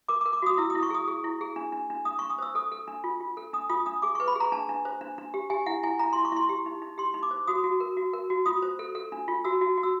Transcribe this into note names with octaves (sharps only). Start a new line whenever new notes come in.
A#4 D6
D6
A#4
D6
F#4 D#6
E4 E6
D#6
E4
C#6
G#4 D#6
G#4
E4
G#4
D4
D4
D4
D4 D#6
D4 C#6
D#6
C5 E6
A4 D#6
A4
D4
F4
F4
A4
D4 D#6
F4 D#6
D4 D#6
G#4 D6
C#6
B4
B5
G#4 A#5
D4 A5
D4
C5
D4
D4
G4
G4 G#5
E4 F#5
E4 G#5
E4 A#5
E4 C6
C#6
E4 C6
G4
D#4
D#4
G4 C6
D#4
D6
C5
F#4 D#6
F#4
A#4
F#4
A#4
F#4
F4 D#6
C5
A4
A4
D4
F4
F#4 E6
F#4
F#4
E6